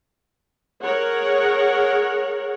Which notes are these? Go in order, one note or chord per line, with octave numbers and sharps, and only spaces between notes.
G#4 A#4 C#5 F#5